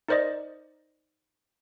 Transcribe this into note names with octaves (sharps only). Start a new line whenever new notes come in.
D#4 A#4 C5 D5 D#5